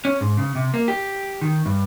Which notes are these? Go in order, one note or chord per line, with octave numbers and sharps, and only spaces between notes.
C#4
G#2
C#3
C3
A#3
G4
D#3
G2